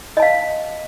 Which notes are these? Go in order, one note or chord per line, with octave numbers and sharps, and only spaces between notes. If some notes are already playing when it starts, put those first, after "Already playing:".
D#5 F5 A5